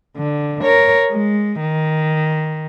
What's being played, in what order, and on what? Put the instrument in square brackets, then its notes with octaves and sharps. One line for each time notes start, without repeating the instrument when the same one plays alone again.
[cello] D3
A#4 C#5
G#3
D#3